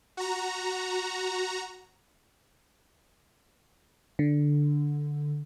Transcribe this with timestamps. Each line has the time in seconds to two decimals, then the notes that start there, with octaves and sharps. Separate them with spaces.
0.17 F#4 A#5
4.19 D3